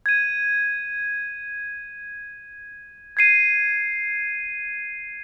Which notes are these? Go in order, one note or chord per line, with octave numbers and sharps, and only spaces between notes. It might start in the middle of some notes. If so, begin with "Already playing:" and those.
G#6 D#7
G#6 C7 D#7